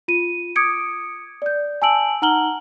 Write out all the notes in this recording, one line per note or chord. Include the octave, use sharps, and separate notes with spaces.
F4 D#7
D6 D#6 G#6 C#7 D7
D5 G6
G#5 A5 E6 D7 F#7
D#4 F#5 A#5 F6 F#7 G7